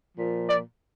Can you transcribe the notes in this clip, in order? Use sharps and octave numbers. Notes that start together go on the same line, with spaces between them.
A#2 F3
D5